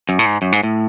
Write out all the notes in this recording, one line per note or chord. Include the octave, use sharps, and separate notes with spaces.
F#2
A2
G#2
F#2
G#2
A2